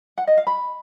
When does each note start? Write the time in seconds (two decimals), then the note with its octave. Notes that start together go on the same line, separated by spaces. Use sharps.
0.18 F#5
0.27 D#5
0.37 F5
0.47 B5